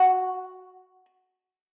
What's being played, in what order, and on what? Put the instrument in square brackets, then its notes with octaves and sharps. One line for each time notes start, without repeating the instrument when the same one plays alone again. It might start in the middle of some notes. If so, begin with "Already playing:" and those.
Already playing: [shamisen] F#4